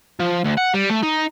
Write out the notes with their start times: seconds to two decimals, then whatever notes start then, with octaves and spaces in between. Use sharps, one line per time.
0.20 F3
0.45 D2
0.58 F#5
0.74 G3
0.90 A3
1.03 D#4